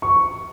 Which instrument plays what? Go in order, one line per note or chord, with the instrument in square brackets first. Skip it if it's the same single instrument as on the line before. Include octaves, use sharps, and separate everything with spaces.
[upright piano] C#6